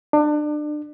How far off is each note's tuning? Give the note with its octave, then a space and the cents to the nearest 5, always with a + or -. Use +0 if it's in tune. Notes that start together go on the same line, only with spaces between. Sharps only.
D4 +30